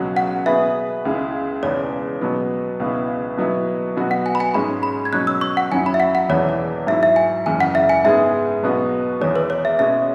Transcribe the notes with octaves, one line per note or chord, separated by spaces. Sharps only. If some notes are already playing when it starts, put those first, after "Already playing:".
Already playing: C#2 B2 F#3 C#4 F#4
F#5
B2 B3 G#4 B4 E5
C#2 C#3 G#3 E4
E1 E2 C#3 G#3 B3 C#5
B2 F#3 B3
C#2 B2 B3 E4
B2 F#3 B3 E4
B2 F#3 B3 F#4
F#5
G#5
B5
G#5
G#2 G#3 C#4 B5
B5
G#6
B2 F#3 C#4 F#6
E6
C#6
F#5
F#2 F#3 C#4 E4 G#5
B5
E5
F#5
F#5
E1 E2 E3 B3 E4 C#5
C#5
G#2 F#3 E4 E5
E5
G#5
F#1 F#2 C#3 E3 G#5
F#5
E5
G#5
G#2 G#3 B3 G#4 E5
B1 B2 B3 F#4
E2 E3 G#3 C#5
B4
C#5
E5
B2 G#3 C#4 E5